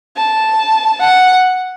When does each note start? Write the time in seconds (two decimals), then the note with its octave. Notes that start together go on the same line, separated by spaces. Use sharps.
0.17 A5
1.01 F#5